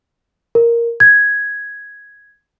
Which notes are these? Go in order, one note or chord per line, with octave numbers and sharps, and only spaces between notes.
A#4
G#6